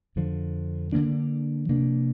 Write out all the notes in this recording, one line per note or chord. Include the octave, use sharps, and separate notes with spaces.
F2 D3 F3
D3 F3 A#3 D4
C3 F3 A#3 D4